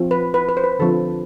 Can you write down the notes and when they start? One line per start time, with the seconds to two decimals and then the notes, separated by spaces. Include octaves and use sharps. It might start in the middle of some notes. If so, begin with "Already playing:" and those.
Already playing: F3 C4
0.11 B4
0.34 B4
0.49 B4
0.57 C5
0.64 B4
0.79 D3 F3 C4 A4